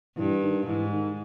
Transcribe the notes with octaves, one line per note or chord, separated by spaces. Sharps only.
G2 E3
D#3
G#2 E3
D#3